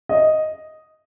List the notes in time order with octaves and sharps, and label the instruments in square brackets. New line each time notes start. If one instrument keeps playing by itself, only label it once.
[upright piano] D#5